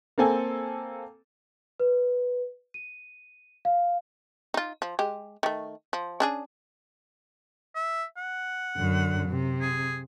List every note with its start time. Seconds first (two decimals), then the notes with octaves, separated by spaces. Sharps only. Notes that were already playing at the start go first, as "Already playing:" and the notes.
0.18 A#3 C4 A4 G#5
1.80 B4
2.74 D#7
3.65 F5
4.54 D#4 F4
4.82 F3
4.99 G#3 G4
5.43 D#3 A3
5.93 F3
6.20 C#4 D4 G#4
7.75 E5
8.17 F#5
8.77 F#2 D3
9.29 C3
9.61 G#4